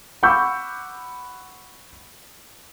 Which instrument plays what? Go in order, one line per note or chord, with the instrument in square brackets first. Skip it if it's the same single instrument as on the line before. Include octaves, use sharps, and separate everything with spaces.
[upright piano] F#5 B5 C#6 D6 E6 G6